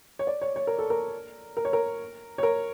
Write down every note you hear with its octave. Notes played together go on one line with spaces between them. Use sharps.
C#5
D5
C#5
C#5
A#4
A4
A#4
A#4
C#5
A#4
C#5
A#4